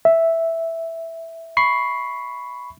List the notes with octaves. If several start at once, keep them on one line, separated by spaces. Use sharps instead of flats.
E5
B5 C#6 C7